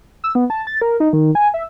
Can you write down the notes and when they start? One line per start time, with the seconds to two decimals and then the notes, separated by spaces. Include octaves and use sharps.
0.24 E6
0.35 B3
0.50 A5
0.67 A6
0.81 A#4
1.00 D#4
1.13 D#3
1.35 G#5
1.54 E5